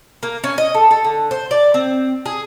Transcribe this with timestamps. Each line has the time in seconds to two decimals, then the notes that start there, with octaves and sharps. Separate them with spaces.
0.23 A#3
0.44 C#4
0.58 D#5
0.75 A4
0.91 A4
1.05 D3
1.31 C5
1.51 D5
1.74 C4
2.26 G#4